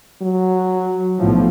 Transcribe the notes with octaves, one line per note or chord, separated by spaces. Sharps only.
F#3
B1 A2 F3